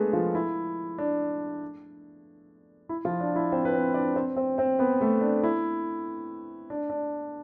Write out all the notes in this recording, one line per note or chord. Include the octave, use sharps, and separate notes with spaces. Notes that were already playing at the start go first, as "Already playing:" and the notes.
Already playing: G#3 A3 B3 D4 G#4 A4 B4
F3 F4
E4
D4
E4
F3 F4
D4
E4
C4 C5
B4
C4 C5
D4 D5
C4 C5
C4 C5
C4 C5
B3 B4
A3 A4
D4
E4
D4
D4